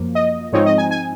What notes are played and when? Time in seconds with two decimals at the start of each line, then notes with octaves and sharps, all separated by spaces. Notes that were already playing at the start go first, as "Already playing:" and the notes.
Already playing: F#2 F3 A#3
0.15 D#5
0.52 G#2 F3 C4 D#4 C#5
0.66 D#5
0.78 G#5
0.91 G#5